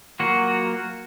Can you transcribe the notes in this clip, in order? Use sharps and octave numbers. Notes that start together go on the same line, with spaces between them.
F#3 A#3 F4 F#4